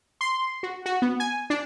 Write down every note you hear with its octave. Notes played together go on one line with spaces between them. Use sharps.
C6
F#4
F#4
B3
G#5
D4